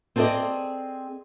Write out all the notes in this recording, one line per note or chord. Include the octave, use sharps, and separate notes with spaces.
C4 G#4 A4 C5 D5 D#5